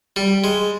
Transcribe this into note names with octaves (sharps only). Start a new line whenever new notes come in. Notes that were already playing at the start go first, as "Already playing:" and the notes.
G3
G#3